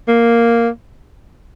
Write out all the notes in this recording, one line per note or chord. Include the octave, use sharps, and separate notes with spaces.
A#3